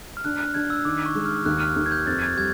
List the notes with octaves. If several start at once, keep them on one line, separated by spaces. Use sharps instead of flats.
F6
D4 F#6
F#6
D4 G#6
E6
D#3 D6
C#6
G#3
F6
D#2 F#6
F6
D#2
G#6
G6
F2 A6
G#6
G3 G#6